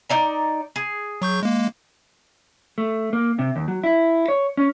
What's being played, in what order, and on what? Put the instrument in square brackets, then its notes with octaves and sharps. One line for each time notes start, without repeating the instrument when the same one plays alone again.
[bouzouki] D#4 D5 A#5
G#4
[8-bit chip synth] F#3 C#6 G6
G#3 A#3
[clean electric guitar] A3
A#3
C3
D#2
F#3
E4
C#5
C#4